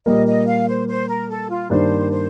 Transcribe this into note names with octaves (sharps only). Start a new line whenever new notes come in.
A#2 G3 A#3 D#5
D#5
F5
C5
C5
A#4
A4
F4
G2 D#3 A#3 D4 C5
C5